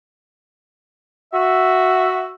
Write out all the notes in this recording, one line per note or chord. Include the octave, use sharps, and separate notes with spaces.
F#4 E5